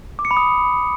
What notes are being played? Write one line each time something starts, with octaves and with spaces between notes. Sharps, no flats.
D6
C#7
B5
D#6